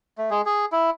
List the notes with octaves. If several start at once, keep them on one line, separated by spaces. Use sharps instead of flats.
A3
G#3 G#4
G#4
E4